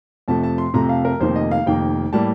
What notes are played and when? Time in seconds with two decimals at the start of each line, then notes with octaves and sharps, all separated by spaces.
0.28 F2 C3 F3 A3 A5
0.43 A5
0.58 C6
0.74 F2 C3 F3 A3 A#5
0.89 F5
1.05 A#4
1.20 F1 F2 D#3 A#3 C5
1.36 D#5
1.51 F5
1.66 F1 F2 D#3 A#3 G5
2.13 A2 G3 A#3 A5